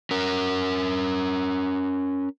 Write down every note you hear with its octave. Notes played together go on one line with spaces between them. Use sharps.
C#4 A#4